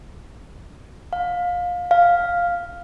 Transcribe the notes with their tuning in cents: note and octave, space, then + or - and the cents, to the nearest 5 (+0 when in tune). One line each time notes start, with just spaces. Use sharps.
F5 +25
F5 +0